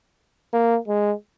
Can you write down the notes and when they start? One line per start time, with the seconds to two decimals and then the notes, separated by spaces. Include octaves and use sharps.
0.53 A#3
0.88 G#3